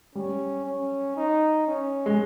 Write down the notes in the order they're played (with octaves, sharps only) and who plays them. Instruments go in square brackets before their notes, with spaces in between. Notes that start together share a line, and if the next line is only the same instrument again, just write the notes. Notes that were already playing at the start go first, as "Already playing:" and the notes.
[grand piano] G3 [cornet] C#4
[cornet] C#4
D#4
C#4
[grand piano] G#3